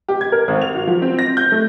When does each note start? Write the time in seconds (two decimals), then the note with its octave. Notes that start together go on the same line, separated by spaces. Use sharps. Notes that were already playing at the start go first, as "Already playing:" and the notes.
0.08 G4
0.21 G#6
0.32 A#4
0.48 G#1
0.61 F7
0.75 F#4
0.87 F3
1.02 C4
1.19 A#6
1.37 G6
1.52 A3